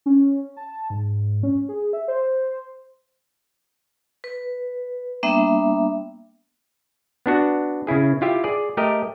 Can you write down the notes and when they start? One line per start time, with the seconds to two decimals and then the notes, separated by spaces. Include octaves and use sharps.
0.06 C#4
0.57 A5
0.90 G#2
1.43 C#4
1.69 G#4
1.93 E5
2.08 C5
4.24 B4
5.23 G3 A#3 B3 D4 E5
7.26 B3 D4 F#4
7.87 C#3 C#4 E4 G#4
8.21 E4 F4 G4 E5
8.44 G#4 D5
8.77 A3 G4 A#4 D#5